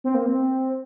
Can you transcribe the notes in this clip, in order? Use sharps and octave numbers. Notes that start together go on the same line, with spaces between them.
C4
A#3
C4